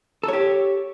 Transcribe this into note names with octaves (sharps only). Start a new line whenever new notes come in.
G4 A4 C#5